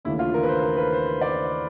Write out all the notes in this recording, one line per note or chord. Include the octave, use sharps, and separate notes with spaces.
D#2 C#3 E3 A3 D4 E4
F4
A#4
B4
C5
A#4
B4
C5
D5